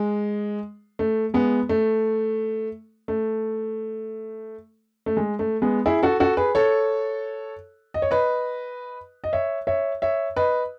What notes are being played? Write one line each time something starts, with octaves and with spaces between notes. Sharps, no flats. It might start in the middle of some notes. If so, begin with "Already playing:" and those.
Already playing: G#3
A3
G#3 B3
A3
A3
A3
G#3
A3
G#3 B3
E4 G#4
F#4 A4
F#4 A4
G#4 B4
A4 C#5
D#5
C#5
B4 D#5
D#5
C#5 E5
C#5 E5
C#5 E5
B4 D#5